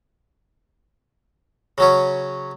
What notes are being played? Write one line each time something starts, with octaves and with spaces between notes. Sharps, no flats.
C#3 F#3 C#4